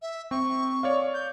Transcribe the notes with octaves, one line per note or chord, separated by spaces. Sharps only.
E5
C4 C#6
C#5 D5 F5
G6